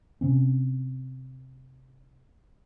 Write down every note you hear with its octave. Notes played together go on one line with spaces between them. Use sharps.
C3 C4 C#4